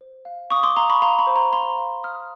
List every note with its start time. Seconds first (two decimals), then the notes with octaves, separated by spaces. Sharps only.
0.01 C5
0.25 F5
0.50 F5 C#6 D#6
0.63 C6 D6
0.76 F5 A#5 C6
0.90 B5 C#6
1.02 F5 A#5 C6
1.19 B5 C#6
1.27 C5
1.36 A#5 C6
1.53 F5 A#5 C6
1.78 F5
2.03 F5 D#6 F6